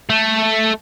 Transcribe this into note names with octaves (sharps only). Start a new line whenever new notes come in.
A3